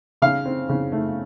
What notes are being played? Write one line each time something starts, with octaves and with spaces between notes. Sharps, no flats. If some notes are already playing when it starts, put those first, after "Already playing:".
C#3 F5
C4
C#3
A3